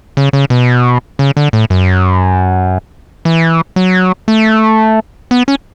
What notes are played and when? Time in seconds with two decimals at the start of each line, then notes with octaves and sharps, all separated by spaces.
0.17 C#3
0.33 C#3
0.50 B2
1.19 C#3
1.37 D3
1.53 A2
1.70 F#2
3.25 E3
3.76 F#3
4.28 A3
5.31 B3
5.48 C#4